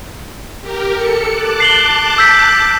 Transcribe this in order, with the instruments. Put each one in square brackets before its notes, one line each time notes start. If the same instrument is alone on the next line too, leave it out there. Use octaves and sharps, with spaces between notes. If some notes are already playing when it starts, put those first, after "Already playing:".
[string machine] G4 A#4
A4 C#7
A5 D6 F#6
[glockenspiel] C7 F#7 G7
E6 G6 B6